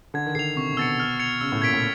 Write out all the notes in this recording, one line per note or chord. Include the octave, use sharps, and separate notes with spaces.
D3 G#6
D#3
D3 C7 F7
C3 C#6
C3
B2 E6 A6 C#7
F6
G#6 C#7 F7
C#3 E6
A2
A#2 G#6 B6 D7
A2